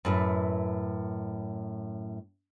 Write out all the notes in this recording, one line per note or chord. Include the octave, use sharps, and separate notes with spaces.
F#2 A2 B4